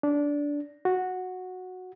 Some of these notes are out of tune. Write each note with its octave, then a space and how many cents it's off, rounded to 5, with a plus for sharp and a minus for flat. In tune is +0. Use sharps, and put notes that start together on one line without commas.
D4 -15
F#4 -10